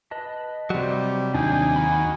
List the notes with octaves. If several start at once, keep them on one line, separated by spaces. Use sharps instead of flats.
B4 D#5 A5
C3 F#3 G3
D#2 D4 G#4 G#5 G6
F#4 A#5 B5